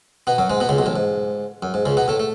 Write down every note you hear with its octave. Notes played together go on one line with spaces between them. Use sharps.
B2 B3
F#2 F#3
G#2 G#3
B2 B3
C#2 C#3
B1 B2
A1 A2
G#2
F#2
G#2
C#2 C#3
B2 B3
A2 A3
A3